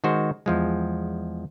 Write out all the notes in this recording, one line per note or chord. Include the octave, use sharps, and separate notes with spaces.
D#3 G#3 F#4 C5
E2 F3 G#3